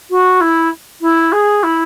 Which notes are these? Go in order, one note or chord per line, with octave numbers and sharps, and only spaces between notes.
F#4
E4
E4
G#4
E4